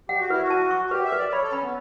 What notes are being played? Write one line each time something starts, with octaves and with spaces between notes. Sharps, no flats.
G4 F#5
F#4
E4 B4
F#4
A5
C#6
F#4
G4 B4
E5
B4
D5
C#5 B5
A4
C#4 B5
B3